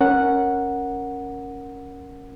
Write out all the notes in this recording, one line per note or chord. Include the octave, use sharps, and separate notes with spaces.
C#4 A#4 F#5